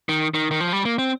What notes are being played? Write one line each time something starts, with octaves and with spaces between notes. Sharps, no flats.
D#3
D#3
D#3
F3
G3
A#3
C4